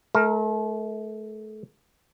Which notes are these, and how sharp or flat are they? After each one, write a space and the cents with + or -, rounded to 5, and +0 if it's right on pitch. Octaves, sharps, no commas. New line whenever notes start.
A3 -35 A#4 +0